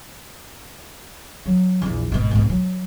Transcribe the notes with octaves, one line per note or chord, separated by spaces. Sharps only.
F#3
A#1 E2
G#1 B2
G#2 B2
F#3